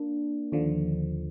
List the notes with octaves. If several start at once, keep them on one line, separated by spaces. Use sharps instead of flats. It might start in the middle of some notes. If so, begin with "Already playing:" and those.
Already playing: A#3 D4
D#2 D3 F3